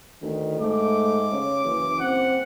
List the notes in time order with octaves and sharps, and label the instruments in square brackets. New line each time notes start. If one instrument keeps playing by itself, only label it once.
[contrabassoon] D2 [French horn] D#3
[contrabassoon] G#2 [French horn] A3 [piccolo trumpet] D6
[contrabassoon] C#3 [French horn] C#5
[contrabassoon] F#1 [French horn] E3
[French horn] C4 [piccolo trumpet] F#5